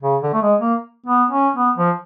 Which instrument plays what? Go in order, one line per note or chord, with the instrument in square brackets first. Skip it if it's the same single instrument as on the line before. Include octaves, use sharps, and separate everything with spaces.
[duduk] C#3
D3
A3
G#3
A#3
B3
C#4
B3
F3